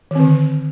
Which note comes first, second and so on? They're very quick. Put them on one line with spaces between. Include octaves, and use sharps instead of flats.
D#3 C4 D3